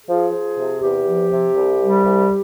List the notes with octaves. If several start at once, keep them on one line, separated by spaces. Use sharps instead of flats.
F3 G#4
F3
C3
E2 G4
F3
C3
C2
G3
C2